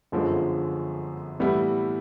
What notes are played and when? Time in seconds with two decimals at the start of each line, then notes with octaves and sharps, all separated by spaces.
0.12 G1 F#2 D3 F3 G#3
1.40 A2 E3 G3 B3 E4